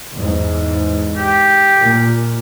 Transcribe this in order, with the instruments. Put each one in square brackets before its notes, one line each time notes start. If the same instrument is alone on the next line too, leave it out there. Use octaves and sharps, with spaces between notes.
[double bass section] E2 G#2
[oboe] G4
[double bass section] A#2